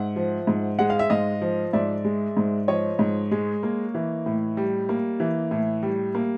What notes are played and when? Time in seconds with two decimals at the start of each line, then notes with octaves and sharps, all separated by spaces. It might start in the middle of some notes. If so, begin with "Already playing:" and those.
Already playing: G#2 E5 F#5
0.16 F3
0.47 G#2
0.79 G#3 F#5
0.90 F5
0.99 E5
1.10 G#2 D#5 F5
1.42 F3
1.73 G#2 D5 E5
2.05 G#3
2.37 G#2
2.68 F3 C#5 D#5
2.99 G#2
3.31 G#3
3.63 A#3
3.94 E3
4.26 A2
4.57 G3
4.89 A#3
5.20 E3
5.51 A2
5.83 G3
6.15 A#3